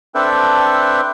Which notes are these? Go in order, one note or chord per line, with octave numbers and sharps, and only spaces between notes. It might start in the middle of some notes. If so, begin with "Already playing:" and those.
C4 D4 A4 B4 E5 G5